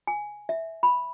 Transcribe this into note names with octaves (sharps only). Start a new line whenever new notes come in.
G#5
E5
B5